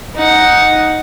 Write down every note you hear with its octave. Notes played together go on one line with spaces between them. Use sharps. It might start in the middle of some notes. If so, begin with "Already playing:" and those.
D#4 F#5